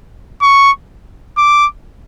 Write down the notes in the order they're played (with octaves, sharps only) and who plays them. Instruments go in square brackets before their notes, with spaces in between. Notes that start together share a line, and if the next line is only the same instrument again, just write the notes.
[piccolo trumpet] C#6
D6